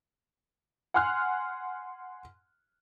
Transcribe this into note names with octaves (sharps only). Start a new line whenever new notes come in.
F#5 G#5 C6 F6 F#6